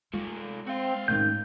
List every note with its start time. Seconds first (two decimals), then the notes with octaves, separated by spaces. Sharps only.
0.13 G#3 A3 F4
0.67 C4 F#4 F5
1.08 G#2 D#3 C#4 G6